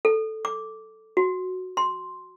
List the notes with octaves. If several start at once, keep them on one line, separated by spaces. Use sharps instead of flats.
A4
D6
F#4
C6